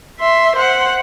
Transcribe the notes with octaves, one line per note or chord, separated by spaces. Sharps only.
E5 C6
C5 F#5